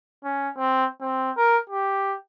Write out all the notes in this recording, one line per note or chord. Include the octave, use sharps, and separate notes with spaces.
C#4
C4
C4
A#4
G4